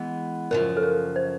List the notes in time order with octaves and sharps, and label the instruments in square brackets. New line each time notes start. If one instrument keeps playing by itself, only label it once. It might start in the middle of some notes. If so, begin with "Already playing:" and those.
Already playing: [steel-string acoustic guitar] E3 G#3 B3
[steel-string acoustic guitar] F#2 C#3 F3 [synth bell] A#4
[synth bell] A4
A#4
C5